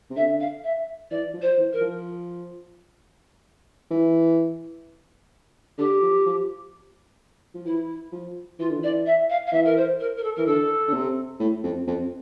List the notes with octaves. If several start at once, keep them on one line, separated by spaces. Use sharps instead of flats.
C3
D3 E5
F5
E5
E3 D5
F3
C5
E3
A#4
F3
E3
D3 G4
F3
F3
F3
E3 E4
F3
E3 F4
D3
E3 D5
E5
F5
F5
E3 E5
A#4
C5
A#4
A#4
A4
E3 A#4
D3 A4
D3
C3
A2
F2
F2